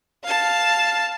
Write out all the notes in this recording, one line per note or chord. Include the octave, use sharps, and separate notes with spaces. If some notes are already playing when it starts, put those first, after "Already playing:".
F5 A5